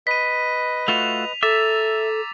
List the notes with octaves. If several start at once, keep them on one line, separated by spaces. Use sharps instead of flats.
B4 D#5 B6 D#7
A3 F4 F#4 F7
A4 E5 A#5 D6 E6 A6